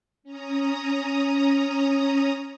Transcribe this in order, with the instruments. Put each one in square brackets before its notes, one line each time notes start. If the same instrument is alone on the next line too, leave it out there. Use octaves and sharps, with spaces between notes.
[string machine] C#4 A#5 D#6